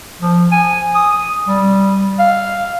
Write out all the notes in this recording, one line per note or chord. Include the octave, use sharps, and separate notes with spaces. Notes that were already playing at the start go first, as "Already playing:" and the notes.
F3
G#5
D#6
D#6
G3
F5